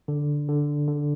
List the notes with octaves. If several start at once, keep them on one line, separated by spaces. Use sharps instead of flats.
D3
D3
D3